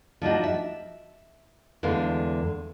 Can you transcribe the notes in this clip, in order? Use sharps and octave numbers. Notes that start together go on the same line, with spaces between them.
F3 D4 D#4 F#4
E5
E2 D3 G#3 F5